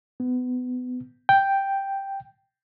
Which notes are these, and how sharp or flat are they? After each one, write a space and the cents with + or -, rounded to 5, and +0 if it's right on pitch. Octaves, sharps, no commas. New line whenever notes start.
B3 +25
G5 +0